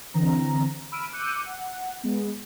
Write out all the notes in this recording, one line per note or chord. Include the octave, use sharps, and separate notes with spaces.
D3 E3 C4 A#5
B5 E6 F6 D7 D#7
D6 E6 F#6 G6 C#7 D#7
F#5
G#3 B3